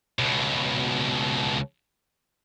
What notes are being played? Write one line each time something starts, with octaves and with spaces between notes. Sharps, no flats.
C#2 B2